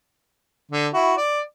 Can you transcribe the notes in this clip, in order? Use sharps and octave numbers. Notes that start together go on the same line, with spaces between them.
D3
E4 F#4
D5